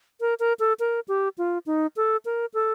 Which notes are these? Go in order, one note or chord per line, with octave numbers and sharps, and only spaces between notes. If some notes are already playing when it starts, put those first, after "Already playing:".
A#4
A#4
A4
A#4
G4
F4
D#4
A4
A#4
A4